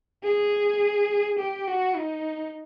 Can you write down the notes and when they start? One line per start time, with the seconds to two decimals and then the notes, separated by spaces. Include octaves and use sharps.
0.24 G#4
1.39 G4
1.68 F#4
1.96 D#4